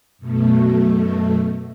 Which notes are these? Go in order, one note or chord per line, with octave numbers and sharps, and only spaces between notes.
F#2 B2 A3